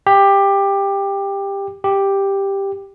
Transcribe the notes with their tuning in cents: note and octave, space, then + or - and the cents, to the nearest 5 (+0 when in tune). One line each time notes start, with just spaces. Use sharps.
G4 +15
G4 +5